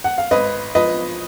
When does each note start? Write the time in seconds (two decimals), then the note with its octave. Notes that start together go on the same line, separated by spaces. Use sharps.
0.04 F#5
0.18 F5
0.31 G#1 B4 D#5
0.75 F3 B4 D#5